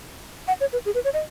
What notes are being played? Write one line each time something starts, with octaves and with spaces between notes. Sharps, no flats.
F#5
C#5
B4
G#4
B4
C#5
D#5